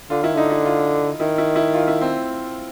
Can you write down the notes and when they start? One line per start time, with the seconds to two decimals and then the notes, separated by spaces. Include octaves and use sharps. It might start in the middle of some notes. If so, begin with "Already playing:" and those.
0.10 D3 F4
0.23 D#3 E4
0.34 D3 D#4
0.50 E4
0.65 F4
1.19 D#3 E4
1.38 E4
1.56 E4
1.74 F4
1.88 E4
2.01 C4